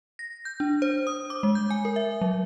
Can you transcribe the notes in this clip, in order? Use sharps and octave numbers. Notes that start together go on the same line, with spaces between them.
A#6
G6
D4
C5
D#6
D6
G#3
G6
G#5
A#4
E5
F#3